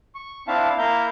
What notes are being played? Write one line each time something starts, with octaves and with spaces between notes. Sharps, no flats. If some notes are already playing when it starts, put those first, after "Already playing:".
C#6
C4 D4 E4 E5 F5 A5
A#3 E4 E5 F5 A#5 G6